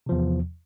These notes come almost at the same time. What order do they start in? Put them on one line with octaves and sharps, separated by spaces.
C3 F3 E2